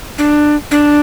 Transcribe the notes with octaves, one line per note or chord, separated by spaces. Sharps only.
D4
D4